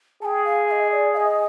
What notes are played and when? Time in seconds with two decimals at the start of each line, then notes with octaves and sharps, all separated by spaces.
0.22 G#4 G5 A5
0.45 F5
0.67 F5
0.71 D#5
0.91 D5
1.13 F5
1.17 D#5